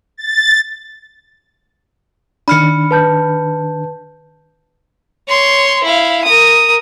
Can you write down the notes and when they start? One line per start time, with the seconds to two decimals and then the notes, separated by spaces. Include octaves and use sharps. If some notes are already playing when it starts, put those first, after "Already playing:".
0.17 A6
2.48 D#3 D4 B5 F6 C#7
2.91 B4 A5 G6
5.28 C#5 C6
5.83 E4 F5
6.25 A#4 D#6